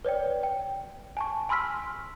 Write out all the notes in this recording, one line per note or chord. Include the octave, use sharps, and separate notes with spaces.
B4 C#5 D5 G5
G5
G#5 A5 C#6
G#5 B5 C6 E6 F6 B6